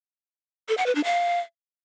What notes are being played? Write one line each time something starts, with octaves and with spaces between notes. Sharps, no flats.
A4
F#5
B4
D4
F5